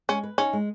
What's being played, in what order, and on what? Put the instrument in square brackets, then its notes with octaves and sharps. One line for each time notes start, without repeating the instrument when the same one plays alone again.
[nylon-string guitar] G#3 [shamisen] C#4
[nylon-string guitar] B4
[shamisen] C#4 [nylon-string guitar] D#4
[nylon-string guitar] G#3